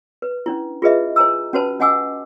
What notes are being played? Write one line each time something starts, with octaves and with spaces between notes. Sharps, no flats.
B4
C#4 D4 E4
F4 G#4 B4 D#5 E5
C5 G#5 A#5 E6
C#4 F#4 B4 C5 A5 B5
C#4 D#5 F#5 G#5 D6 E6